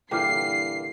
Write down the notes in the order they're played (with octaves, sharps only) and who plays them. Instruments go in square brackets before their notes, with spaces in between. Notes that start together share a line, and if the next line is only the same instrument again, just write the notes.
[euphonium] G2 [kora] A#2 D3 E3 [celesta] G5 D6 F6 [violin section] C7